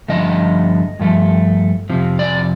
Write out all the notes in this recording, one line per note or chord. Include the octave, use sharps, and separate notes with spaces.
G2 D3 F3 A3 D#5
G2 F3 A3
F2 C3 F3
D5